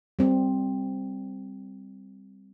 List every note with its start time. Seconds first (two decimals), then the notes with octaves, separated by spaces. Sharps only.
0.19 G3 C4